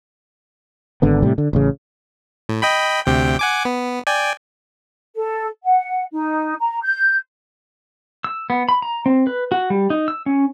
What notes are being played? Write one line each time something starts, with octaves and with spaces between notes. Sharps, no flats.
G#1 D3 B3
A2 C3 G3
D3
A1 C#3
A2
D#5 G5 B5
D2 C3 G5
F#5 G#5 D6
B3
D5 G5 G#5
A4
F#5
D#4
A#5
G6
E6
B3
B5
A#5
C4
B4
F#4
G3
D#4
E6
C#4